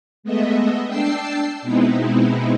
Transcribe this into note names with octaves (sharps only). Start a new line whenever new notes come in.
G#3 A3 B3 D#5 E5
D4 G5 A5 E6 C7
B2 G#3 B3 C4 D#4 E4